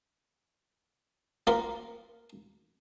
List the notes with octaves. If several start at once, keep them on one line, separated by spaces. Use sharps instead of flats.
A#3 F4 A#4 B4 F#5